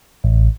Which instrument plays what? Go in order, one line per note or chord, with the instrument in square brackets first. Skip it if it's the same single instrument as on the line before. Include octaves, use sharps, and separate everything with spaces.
[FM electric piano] A1